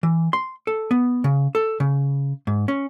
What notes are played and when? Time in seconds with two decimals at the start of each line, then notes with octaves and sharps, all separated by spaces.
0.03 E3
0.33 C6
0.67 A4
0.91 B3
1.24 C#3
1.55 A4
1.80 C#3
2.47 G#2
2.68 C#4